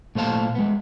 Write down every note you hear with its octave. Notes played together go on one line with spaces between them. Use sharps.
A#2 A3 C5 F5 A5
G#3 B3